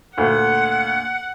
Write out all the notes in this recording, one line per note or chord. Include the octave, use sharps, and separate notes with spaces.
D2 A#2 F#5